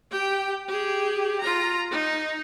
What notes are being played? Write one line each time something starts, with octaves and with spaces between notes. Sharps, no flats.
G4 G5
G4 G#4
F4 A#5
D#4